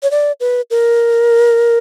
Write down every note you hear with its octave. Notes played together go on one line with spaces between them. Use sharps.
C#5
D5
B4
A#4